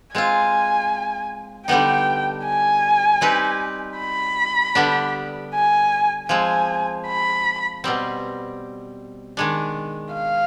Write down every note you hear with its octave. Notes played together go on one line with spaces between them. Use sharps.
G#3 C4 F4 G#5
D3 G3 B3 D#4 G5
G#5
G3 C4 D#4 G4 B4
B5
D3 G3 B3 D4
G#5
F3 G#3 C4 G#5
B5
B2 G3 C4
D#3 G#3 D4
F5